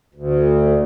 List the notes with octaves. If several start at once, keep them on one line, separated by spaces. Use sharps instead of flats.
D2